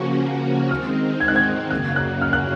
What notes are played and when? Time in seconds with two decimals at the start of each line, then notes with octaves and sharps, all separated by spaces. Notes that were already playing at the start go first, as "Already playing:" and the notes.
Already playing: C#3 F3 A#3 C#4 F#4
0.71 D#3 G#3 C4 D#4 F6
1.20 G#6
1.28 F#6
1.36 G#6
1.70 F#2 C#3 F#3 A#3 F#6
1.96 F#6
2.21 F6
2.33 F#6